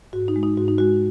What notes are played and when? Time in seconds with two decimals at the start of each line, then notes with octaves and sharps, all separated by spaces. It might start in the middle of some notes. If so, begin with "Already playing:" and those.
0.13 G#2 F#4
0.28 D#4
0.36 G#3
0.43 D#4
0.57 G#2 F#4
0.68 D#4
0.78 G#3 F#4